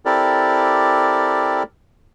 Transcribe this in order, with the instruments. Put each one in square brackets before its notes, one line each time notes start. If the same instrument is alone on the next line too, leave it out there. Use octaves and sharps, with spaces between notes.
[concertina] C4 E4 G4 A4 A#4 D5